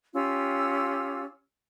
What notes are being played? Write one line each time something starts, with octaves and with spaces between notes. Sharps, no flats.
C#4 F4 G4 E6